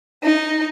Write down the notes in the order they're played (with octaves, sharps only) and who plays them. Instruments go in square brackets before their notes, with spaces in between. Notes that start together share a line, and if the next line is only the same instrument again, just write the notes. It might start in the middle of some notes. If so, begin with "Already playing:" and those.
[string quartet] D#4